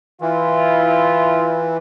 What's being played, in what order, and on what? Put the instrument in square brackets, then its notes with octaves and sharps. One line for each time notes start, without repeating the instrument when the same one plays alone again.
[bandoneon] E3 [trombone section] E4 F4